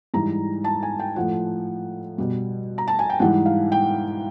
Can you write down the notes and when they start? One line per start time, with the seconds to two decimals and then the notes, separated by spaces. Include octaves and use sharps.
0.14 G#2 E3 G3 A#5
0.64 A5
0.83 G#5
0.99 G5
1.16 A2 F3 F#5
2.18 B2 G3
2.78 A#5
2.88 A5
2.99 G#5
3.10 G5
3.20 G#2 E3 G3 F#5
3.46 F5
3.72 G5